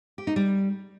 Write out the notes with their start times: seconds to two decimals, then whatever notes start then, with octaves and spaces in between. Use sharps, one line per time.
0.18 G4
0.27 D#4
0.36 G3